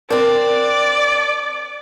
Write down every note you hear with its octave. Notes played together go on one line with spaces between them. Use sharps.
C4 D4 A#4 D5